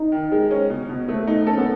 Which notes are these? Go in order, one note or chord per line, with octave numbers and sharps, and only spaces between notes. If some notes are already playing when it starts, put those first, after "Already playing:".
Already playing: D#4
D#3
G#3
C#4
B2
B2
A3
D#4
C#4 A4
B3